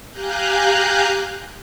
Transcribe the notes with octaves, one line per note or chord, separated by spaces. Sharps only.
G4 F5 G#5 A#5 F#6 G6